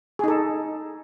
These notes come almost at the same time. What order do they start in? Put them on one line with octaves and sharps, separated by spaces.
G#4 D#4 A4